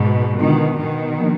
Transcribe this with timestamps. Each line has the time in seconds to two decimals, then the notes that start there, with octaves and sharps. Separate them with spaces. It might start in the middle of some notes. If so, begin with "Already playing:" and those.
Already playing: G#2 B2
0.39 B2 D3 D#3 G#3 B3 D4 F4
0.79 B2 D#3
1.19 F3 A#3 D4